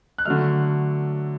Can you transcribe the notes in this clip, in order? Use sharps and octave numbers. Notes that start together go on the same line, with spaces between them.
F#6
D3 F#3 A3 F6